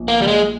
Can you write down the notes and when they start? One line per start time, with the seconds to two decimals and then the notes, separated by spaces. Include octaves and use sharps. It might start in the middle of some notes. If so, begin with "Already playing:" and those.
Already playing: A#1
0.08 A#3
0.22 G3
0.28 G#3